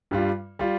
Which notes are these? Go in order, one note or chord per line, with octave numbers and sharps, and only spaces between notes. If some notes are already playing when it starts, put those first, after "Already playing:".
G2 G3 F4
G3 F4